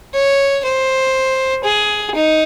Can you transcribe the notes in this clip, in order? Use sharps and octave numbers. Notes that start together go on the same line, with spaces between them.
C#5
C5
G#4
D#4